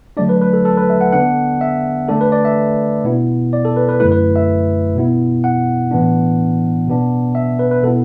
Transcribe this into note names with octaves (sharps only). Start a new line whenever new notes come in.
D3 F#3 A3 D4 D5
B4
B4
A4
A4
B4
E5
F#5
D3 B3 D4 F#5
E5
D3 A3 D4 A4
B4
D5
E5
B2 B3 E4
D5
A4
B4
B4
F#2 D3 A3 E4 B4
B4
E5
B2 B3 E4
F#5
A2 E3 B3 D4
B2 B3 D4
E5
B4
B4
B2 B3 E4 A4